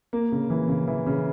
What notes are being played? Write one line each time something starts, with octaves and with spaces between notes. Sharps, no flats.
A#3
C#3
E3
C#3
E3
C#3